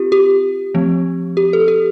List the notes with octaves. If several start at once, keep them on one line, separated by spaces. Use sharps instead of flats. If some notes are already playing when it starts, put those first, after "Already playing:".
Already playing: C4 F4 G4
G4
F3 A3 C4
G4
A4
G4